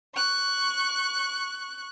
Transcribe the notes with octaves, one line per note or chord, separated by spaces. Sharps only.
C#6 F#6